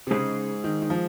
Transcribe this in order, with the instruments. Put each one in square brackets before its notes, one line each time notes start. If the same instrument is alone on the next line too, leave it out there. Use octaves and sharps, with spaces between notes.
[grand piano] C3
[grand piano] C#3 [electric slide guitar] G#3 D#4 G#4 C5
[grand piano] D#3
D#3
F3